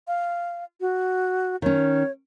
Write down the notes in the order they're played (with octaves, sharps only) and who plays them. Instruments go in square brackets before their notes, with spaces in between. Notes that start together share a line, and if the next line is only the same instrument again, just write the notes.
[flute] F5
F#4
[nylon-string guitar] D#3 C#4 [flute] C#5